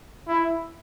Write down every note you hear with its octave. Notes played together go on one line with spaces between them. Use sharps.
E4